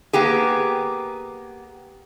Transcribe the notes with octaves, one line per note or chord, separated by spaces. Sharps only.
A#3 B3 G4 G#4